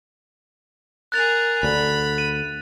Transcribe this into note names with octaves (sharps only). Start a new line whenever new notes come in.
G#4 A#4 F#6 A6 F7
D2 D3 B5
D#7